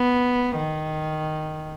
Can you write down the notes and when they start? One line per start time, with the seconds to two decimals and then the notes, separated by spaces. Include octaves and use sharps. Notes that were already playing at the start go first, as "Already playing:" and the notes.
Already playing: B3
0.57 D#3